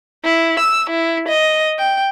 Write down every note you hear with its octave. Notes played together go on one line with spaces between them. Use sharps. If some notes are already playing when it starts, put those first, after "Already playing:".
E4
E6
E4
D#5
G5